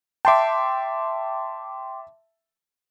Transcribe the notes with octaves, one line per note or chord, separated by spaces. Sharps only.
E5 G5 A5 C6 D6